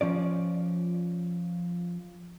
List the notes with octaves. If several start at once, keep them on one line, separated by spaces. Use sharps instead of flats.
F3 C#4 D5